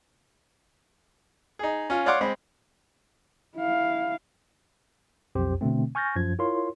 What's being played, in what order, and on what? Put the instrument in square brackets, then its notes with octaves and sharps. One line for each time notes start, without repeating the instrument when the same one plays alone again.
[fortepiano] D#4 G#4
C#4 F4
C#5 D5 F5 F#5 C6 D6
G#3 C4 B5
[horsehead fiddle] E4 F5
[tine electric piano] B1 F2 G4 C5
B2 D3 A3 C4
G#5 C#6 F6 G6 A6 A#6
F#2 F3 G#6
E4 F4 A#4 C#5 C6